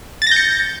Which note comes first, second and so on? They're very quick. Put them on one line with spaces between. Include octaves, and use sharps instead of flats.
A6 A#6 G6 C#7